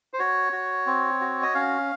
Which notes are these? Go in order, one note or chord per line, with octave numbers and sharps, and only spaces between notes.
C5
F#4 C#5
F#4
C4
F#4
D#5
C#4 F5